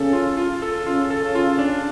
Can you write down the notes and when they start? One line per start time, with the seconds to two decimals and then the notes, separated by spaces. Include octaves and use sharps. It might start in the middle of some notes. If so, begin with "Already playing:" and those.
Already playing: C#3 C#4 A4
0.13 F4
0.37 F4
0.62 A4
0.86 C#3 C#4 F4
1.11 A4
1.35 F4
1.59 D4